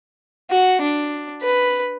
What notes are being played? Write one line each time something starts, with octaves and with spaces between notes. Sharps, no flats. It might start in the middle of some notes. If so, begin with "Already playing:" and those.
F#4
D4
B4